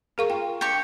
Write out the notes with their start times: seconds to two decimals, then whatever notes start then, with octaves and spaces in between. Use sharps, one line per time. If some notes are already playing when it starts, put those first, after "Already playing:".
0.18 G#4 A#4 F5 C#6
0.30 F4 G5
0.61 D4 G4 C#6